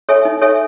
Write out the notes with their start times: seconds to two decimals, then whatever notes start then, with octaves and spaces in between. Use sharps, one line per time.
0.09 A4 C#5 E5 G#5
0.25 D#4
0.42 A4 C#5 E5 G#5